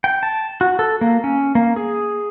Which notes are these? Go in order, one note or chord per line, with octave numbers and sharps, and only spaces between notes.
G5
A5
F#4
A4
A#3
C#4
A#3
G#4